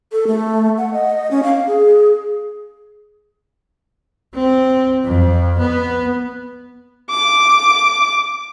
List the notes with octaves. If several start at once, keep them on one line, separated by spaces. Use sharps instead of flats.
A4
A3
F#5
D#5
C#4
F5
G#4
C4
F2
B3
D6